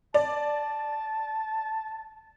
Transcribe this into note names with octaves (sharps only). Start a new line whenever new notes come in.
D5 A5